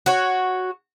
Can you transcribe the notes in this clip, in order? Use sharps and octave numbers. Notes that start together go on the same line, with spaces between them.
F#4 C#5